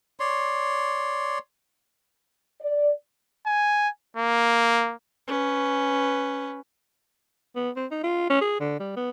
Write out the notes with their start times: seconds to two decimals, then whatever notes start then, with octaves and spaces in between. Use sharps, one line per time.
0.20 C#5 D5 C6
2.61 D5
3.46 G#5
4.17 A#3
5.28 C#4 B4
7.55 B3
7.76 C4
7.91 D#4
8.03 F4
8.30 C#4
8.41 G#4
8.60 D3
8.80 G3
8.96 B3